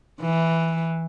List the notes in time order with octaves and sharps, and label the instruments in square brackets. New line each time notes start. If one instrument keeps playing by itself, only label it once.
[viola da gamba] E3